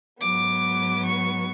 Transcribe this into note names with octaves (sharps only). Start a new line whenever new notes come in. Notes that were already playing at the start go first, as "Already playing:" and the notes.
G#2 F#3 B3 D6
C#6